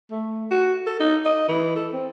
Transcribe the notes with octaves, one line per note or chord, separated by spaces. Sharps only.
A3
F#4
A4
D#4
D#5
E3
A4
C4